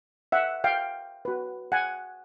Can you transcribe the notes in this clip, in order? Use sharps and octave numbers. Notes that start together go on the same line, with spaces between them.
E5 F#5
F5 G5
F#4 B4
F#5 G#5